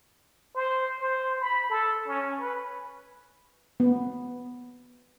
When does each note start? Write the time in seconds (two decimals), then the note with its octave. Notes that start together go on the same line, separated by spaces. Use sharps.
0.55 C5
1.00 C5
1.40 B5
1.69 A4
2.07 C#4
2.40 B4
3.80 B3